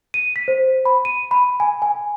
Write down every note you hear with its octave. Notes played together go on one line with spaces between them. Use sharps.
D#7
B6
C5
B5
D#7
B5
G#5
G#5